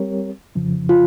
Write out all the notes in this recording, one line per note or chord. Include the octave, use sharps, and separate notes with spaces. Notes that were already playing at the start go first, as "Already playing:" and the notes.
Already playing: G3 C4 G4 A#4 C#5
F2 C#3 F3
F4